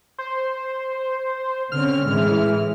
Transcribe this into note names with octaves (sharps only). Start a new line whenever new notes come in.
C5
D3 C4 C#4 F6
A2 E3 G#3